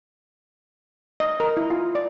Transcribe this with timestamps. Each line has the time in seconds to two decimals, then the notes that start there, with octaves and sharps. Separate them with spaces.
1.20 D#5
1.40 A#4
1.57 E4
1.70 F4
1.95 D5